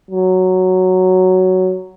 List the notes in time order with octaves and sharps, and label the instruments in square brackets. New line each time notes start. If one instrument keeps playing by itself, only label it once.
[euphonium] F#3